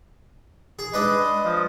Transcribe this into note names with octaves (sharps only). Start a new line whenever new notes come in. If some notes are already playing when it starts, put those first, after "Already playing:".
G#4
G#3 D4 B4 D#5
F3